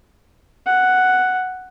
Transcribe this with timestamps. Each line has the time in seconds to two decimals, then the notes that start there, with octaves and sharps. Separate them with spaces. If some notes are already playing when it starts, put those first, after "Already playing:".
0.66 F#5